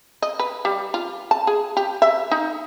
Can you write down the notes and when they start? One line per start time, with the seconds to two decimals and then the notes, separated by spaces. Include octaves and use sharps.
0.22 D#5
0.39 B4
0.65 G3
0.94 F4
1.31 A5
1.47 G#4
1.77 G4
2.02 E5
2.31 D#4